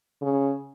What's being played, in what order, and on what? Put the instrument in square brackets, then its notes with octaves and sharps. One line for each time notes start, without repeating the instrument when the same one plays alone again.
[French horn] C#3